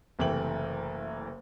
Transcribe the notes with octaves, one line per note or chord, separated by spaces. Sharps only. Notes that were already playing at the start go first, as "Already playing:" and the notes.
F#1 C3 E3 A3 G5 F#7